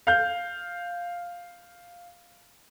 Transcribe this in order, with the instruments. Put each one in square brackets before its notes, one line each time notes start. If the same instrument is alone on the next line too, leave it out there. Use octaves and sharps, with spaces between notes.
[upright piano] F5 G6